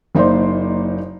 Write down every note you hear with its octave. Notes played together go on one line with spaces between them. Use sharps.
F#1 A#3 D#4 C5 D5 C6